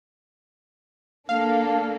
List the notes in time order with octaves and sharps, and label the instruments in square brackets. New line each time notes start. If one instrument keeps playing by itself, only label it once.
[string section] A#3 D4 A4 [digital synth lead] F5